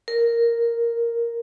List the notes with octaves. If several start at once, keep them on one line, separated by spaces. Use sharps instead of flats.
A#4